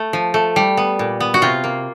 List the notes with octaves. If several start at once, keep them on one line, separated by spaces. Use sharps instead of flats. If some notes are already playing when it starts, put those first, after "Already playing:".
Already playing: A3
F3
A3
G3
B3
A#2
B3
F#4
C3 F4
A#3